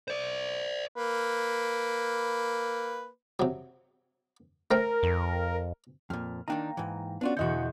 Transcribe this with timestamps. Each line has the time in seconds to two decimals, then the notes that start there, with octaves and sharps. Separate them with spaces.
0.08 C5 D5
0.96 A#3 B4
3.40 C3 F#3
4.71 A3 A#4 C5 G5
5.03 F2
6.10 F2 A#2 F6
6.48 D#3 A#3 D4 D#4 G5 A#5
6.77 G#2 E3
7.21 B3 C#4 D4 F4 F#4 D5
7.37 E1 E2 D3 E3 F#4 D#5 G6 C#7